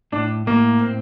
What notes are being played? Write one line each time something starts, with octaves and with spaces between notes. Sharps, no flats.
A2 D4
A2 A#3
C4